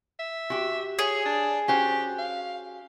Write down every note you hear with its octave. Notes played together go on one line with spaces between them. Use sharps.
E5
F#4 G4
G#4 C#5
D4
C#4 F#4 G4 C5
F5